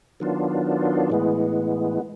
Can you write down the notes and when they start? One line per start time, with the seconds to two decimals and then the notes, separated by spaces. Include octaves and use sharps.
0.20 D#3 F#3 B3 D4 F4
1.10 A2 E3 G#3 B3